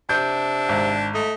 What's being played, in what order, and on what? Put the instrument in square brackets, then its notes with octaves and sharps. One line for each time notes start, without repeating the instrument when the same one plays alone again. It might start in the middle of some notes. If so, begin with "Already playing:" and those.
[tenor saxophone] C3 [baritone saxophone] D4 [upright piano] G6
[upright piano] G#1
[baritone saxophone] A3 [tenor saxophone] D#5